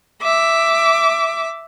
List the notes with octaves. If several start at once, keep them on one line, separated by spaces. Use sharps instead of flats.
E5 D6